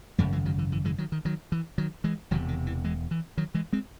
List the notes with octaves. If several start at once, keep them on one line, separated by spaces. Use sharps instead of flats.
G#1 F#2 C#3 F#3 A3
E3 G#3
D#3 F#3
E3
E3
E3 G#3
D#3 F#3
D#3
D#3 F#3
E3
D#3 F#3
E3 G#3
E1 E2 C3 D#3 F#3
D#3
E3
E3 G#3
E3
D#3 F#3
E3 G#3
G#3 C4